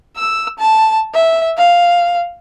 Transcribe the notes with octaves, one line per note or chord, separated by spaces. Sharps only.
E6
A5
E5
F5